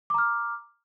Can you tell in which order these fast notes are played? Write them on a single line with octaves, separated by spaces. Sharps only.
D6 A#5 F6